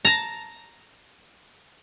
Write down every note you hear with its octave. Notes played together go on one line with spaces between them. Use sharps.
A5 A#5